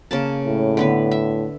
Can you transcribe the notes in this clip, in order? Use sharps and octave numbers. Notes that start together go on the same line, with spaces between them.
C#3 A#3 A5
A2
D3 B3 B4
E5